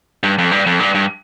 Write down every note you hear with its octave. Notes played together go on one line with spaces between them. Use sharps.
G2
F2
G2
F2
G2
G2